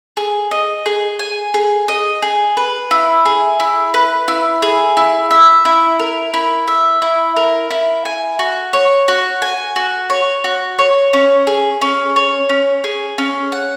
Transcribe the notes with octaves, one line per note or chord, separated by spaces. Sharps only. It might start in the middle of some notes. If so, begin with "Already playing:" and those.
G#4
D#5
G#4
G#5
G#4
D#5
G#4
B4
E4
G#4
E4
B4
E4
G#4
E4
E5
E4
A#4
E4
E5
E4
A#4
E4
G#5
F#4
C#5
F#4
G#5
F#4
C#5
F#4
C#5
C#4
G#4
C#4
C#5
C#4
G#4
C#4
F#5